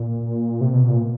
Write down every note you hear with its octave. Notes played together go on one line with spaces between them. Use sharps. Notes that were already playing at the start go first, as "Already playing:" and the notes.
Already playing: A#2
C3
B2
A#2